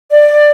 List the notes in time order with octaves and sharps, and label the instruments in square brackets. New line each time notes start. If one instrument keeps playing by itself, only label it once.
[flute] D5